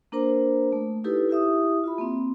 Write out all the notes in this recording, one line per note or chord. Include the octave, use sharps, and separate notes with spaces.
A#3 D4 A#4 C5 A#5
A3
D#4 E4 G4 A4 B4
E4 G4 E5 D#6
F4 E5 B5
A#3 C4